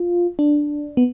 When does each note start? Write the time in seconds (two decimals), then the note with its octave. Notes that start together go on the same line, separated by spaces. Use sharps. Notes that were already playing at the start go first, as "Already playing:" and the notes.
Already playing: F4
0.39 D4
0.97 B3